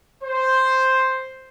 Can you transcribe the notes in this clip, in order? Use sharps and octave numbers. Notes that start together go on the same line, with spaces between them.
C5